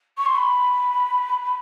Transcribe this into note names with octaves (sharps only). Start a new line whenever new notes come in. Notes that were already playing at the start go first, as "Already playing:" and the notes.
C#6
C6
B5